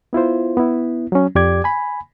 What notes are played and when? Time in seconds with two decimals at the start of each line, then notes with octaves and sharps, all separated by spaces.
0.13 B3 E4 F4 C5
0.57 B3 E4
1.12 F#3 C#4
1.35 F2 G4 D5 D6 G#6
1.64 G#5 B5